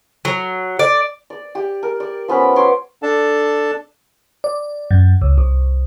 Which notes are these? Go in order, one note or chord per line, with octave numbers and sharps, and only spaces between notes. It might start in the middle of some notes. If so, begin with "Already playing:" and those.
F#3
D5
D5
G4
A#4
D5
F3 B3 C#4 B5
C#5 C6 D6
D4 A4 A5
D5
F#2
C#2
C2